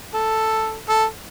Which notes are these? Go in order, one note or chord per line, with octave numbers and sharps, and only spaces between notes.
A4
A4